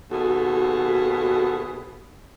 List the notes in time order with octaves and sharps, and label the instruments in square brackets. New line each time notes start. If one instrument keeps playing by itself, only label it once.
[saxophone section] D#2 B2 G#4 [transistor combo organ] F#4 A4